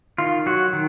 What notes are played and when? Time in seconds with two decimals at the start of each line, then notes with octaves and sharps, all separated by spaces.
0.18 D#3 F4
0.46 F#3 F#4
0.73 D#3